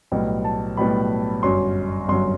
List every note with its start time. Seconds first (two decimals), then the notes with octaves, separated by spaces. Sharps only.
0.12 B1 A2 G3 B3
0.44 A5
0.77 B1 A2 G3 B3 B5
1.43 G1 F#2 F#3 C6
2.08 G1 F#2 F#3 C6